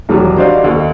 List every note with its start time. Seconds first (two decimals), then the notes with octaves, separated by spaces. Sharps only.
0.09 E1 D#3 F#3 G3
0.37 D4 F#4 C5 D5 D#5 F5
0.64 D#2 A4 D#5